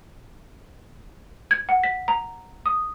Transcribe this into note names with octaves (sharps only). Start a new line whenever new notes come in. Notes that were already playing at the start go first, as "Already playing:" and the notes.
G#6
F#5
B6
A#5
D#6